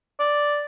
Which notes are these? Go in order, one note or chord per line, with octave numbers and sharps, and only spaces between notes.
D5